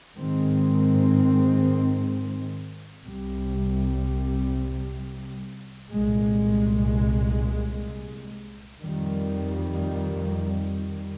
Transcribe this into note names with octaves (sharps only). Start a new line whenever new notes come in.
G#2 D#3 G#3 C4
C2 C3 G3
C2 A#2 G#3
F2 D#3 G3